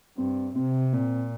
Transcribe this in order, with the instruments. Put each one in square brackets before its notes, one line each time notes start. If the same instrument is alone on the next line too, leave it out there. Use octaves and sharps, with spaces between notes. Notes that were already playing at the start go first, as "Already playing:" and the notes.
[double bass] G2 [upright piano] C4
[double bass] C3 [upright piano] C4
[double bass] A#2 [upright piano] C4